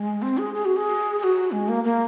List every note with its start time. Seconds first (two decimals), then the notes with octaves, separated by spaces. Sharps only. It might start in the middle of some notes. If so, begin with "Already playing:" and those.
Already playing: G#3
0.22 C4
0.38 G#4
0.54 G#4
0.65 F#4
0.76 G#4
1.19 G#4
1.24 F#4
1.52 G#3
1.69 A#3
1.84 A#3